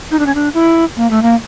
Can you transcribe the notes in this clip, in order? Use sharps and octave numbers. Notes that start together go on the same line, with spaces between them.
D#4
D4
C#4
D4
E4
A#3
A3
A#3